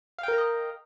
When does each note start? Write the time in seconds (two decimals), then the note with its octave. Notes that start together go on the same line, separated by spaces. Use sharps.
0.18 F5
0.23 G5
0.28 A#4
0.33 A#5
0.38 D#5